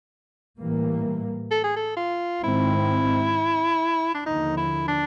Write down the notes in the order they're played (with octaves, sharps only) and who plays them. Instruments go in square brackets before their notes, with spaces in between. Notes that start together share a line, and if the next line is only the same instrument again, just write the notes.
[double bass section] A2 E3 G3 A#3
[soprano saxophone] A4
G#4
A4
F4
[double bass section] G#2 D#3 G#3 C4 [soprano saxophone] E4
[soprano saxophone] D4
[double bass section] D#2 D3 F3 [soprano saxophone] D#4
[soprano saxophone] E4
D4